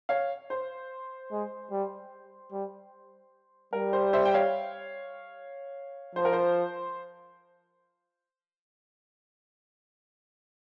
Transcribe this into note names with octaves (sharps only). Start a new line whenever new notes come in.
C#5 F5
C5
G#3
G3
G3
G3 A#4
C5
C5 E5
G5
C#5 F5
F3 C5
A#4
C5